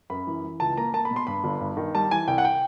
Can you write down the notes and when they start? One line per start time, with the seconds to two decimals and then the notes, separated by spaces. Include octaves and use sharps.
0.10 F#2 B5
0.27 E3
0.43 E3
0.60 C#2 A5
0.77 A#3 A#5
0.93 A#3 A5
1.05 B5
1.11 B2
1.16 C6
1.27 G2 B5
1.44 G1
1.61 G2
1.77 D#3
1.94 G3 A5
2.11 E3 G#5
2.28 C2 G5
2.38 F#5
2.45 G5